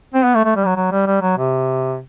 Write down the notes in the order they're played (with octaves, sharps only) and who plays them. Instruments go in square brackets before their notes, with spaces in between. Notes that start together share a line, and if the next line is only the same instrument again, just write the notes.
[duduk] C4
B3
A3
A3
G3
F#3
F#3
G3
G3
F#3
C3